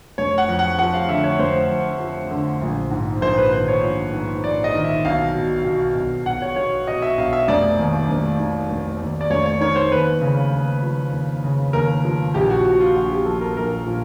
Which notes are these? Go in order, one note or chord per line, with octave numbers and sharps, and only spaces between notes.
F1 C#5
F#5
F2
F#5
F3 F#5
F5
D3 E5
C#5
F1 C5
F2
F3
D3
A#1
G#2
A#1 C5
B4
D#3 C5
C#5
A#1
G#2
A#1 D5
D#5
D#3
E5
B1 F5
B2
B2
B1
B1 F#5
C#5
B2 C#5
B2 D#5
E5
B1 F5
E5
F1 D5
D#2
F1
D#3
F1
D#2
D5
F1 C#5
C#5
D#3 C#5
C5
D#2 B4
C#3
D#2
F3
D#2
C#3
D#2 A#4
F3
A#1 G4
F#4
A#2 F#4
F4
A#1 F#4
G4
F3 A4
A#4
A#1 A#4
A#2